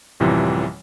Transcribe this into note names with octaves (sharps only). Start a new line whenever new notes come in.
A1 F#2 C3 E3 F3 G3